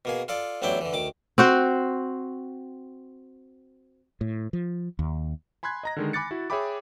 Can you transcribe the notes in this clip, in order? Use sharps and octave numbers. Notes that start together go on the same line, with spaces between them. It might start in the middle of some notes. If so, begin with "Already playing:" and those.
B2 A#3 G#4
F4 A4 D5
A1 E2 F#3 D4 E4 G5
D3 E3
D2 D#3 D6
C4 F#4 C5
A2
F3
D#2
G#5 B5 C6 F#6 G#6
D#5 A#5 A#6
D3 D#3 G#3
G#5 B5 D6 F#6 A6 C#7
E4 F#4
G#4 C#5 E5 G5 B5 D6